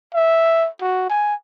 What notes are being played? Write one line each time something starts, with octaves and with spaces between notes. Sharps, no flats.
E5
F#4
G#5